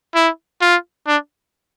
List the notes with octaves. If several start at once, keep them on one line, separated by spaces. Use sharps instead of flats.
E4
F4
D4